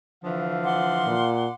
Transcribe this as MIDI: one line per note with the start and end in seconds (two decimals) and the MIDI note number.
0.24 1.15 50
0.24 1.15 52
0.24 1.15 53
0.24 1.33 77
0.64 1.53 78
0.64 1.53 84
0.64 1.53 86
1.06 1.49 46